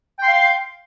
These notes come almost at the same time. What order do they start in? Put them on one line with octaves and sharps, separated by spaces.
G5 C6 F5